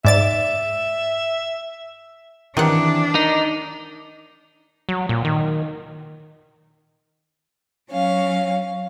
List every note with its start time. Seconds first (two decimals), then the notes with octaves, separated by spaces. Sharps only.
0.05 G#2 D5 E5 A6
2.57 D#3 E3 C4 D4 G4 F#5
3.15 D#4 A#4
4.89 F#3
5.09 A#2
5.25 D#3
7.91 F#3 C#4 F5